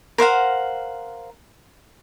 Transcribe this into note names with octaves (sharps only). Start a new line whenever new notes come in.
A#4 C5 F5 F#5